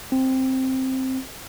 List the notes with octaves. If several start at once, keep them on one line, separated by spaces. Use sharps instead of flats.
C4